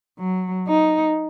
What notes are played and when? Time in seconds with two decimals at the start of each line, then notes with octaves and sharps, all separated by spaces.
0.19 F#3
0.68 D#4